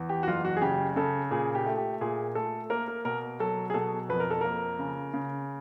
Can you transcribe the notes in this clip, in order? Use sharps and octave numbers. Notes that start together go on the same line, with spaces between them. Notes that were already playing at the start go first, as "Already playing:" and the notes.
Already playing: E2
G4
F#4
F#1 F4
F#4
G#4
C#3 G4
C#3 A4
A#2 G#4
G4
A3
G4
A#2 G#4
A3 A4
A#3 A#4
A#4
B2 A#4
F#3 A4
G#4
B2 A4
F2 B4
A#4
A4
A#3 A#4
C#3
C#3